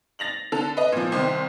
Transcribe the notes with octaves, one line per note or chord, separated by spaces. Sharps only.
A6 A#6 F7 F#7
D3 A4 F7
B4 D#5
A#2 F3
C2 D#3 C5